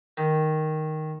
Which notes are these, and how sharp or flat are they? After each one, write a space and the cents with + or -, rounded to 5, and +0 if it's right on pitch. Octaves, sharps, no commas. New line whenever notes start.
D#3 +0